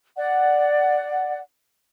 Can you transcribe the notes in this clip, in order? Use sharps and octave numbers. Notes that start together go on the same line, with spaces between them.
D5 F#5